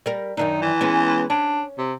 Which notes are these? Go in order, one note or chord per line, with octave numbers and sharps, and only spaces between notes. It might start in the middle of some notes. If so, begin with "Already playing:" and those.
G3 A#4
F#2 D#3 D4 D#4
E3
G#3 B3 C#4
C#4 D4
C3